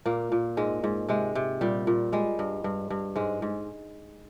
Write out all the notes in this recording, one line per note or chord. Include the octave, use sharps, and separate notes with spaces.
A#2 A#3
A#2
G#2 G#3
G#2
C3 G#3
C3
A#2 G3
A#2
G3 G#3
G2
G2
G2
G#2 G#3
G#2